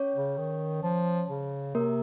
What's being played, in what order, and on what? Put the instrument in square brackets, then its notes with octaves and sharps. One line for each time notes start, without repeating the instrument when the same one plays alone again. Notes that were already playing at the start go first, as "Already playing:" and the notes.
Already playing: [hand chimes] C#4 C#5
[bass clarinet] C#3
D#3
F3
C#3
[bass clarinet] C3 [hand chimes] A#3 A#4